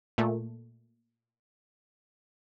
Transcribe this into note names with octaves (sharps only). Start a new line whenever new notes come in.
A#2 A3